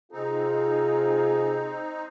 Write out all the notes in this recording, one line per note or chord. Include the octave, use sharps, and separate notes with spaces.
C3 C4 D#4 F4 G#4